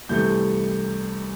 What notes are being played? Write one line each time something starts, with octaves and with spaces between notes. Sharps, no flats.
C2 C3 E3 A3 G6